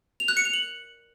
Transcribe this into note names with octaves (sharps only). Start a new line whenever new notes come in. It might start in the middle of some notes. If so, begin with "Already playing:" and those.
F7
F#6
C#7
F7
F#7